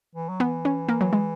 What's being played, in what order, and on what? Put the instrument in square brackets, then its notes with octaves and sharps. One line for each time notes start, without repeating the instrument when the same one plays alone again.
[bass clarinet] E3
F#3
[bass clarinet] E3 [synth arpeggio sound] B3
[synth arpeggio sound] C#4
A#3
F#3
G#3